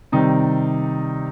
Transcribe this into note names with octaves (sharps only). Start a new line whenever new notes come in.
C3 D#3 G3 C4 D#4